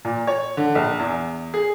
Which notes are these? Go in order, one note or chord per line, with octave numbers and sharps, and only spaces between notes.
A#2
C#5
D3
A#1
E2
G#4